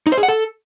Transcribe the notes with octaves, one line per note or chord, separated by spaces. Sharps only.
D#4
C5
G#4
F#5
A4